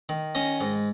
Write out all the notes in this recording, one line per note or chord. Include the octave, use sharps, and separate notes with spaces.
D#3
C#4 D#5
G#2